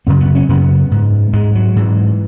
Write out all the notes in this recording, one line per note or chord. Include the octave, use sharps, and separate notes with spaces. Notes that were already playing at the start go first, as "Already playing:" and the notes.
F#2 C#3 B3
B3
C#4
F#2 C#3 B3
G#2
G#2 G#3
F#3
G#2 E3